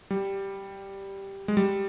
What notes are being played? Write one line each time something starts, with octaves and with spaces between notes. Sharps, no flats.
G3
G#3
G3